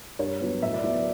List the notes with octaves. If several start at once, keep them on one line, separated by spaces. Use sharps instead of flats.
G2 C#5
F#3 B3
A2 E5
D5
F#3 B3 D5
D5